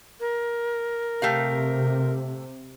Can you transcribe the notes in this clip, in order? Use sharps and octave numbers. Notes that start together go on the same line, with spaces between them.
A#4
C3 A3 G4 F5